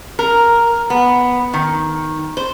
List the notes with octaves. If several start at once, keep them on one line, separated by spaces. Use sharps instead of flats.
A#4
B3
D#3
C5